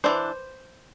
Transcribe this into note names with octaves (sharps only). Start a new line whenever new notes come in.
E3 A3 D4 C5